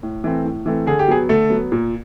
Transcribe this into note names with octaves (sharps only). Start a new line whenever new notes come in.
A2
E3 A3 C4
A2
E3 A3 C4
D3 G#4
G4
F#3 B3 G#4
D3 A3 A4
F#3 B3
A#2